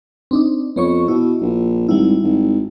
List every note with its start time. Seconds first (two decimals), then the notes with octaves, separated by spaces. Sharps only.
0.31 C4 D4 D#4
0.76 F2 B3 C#5 C#6
1.08 B2 E4
1.41 A#1
1.89 G#1 G3 E4
2.23 G#1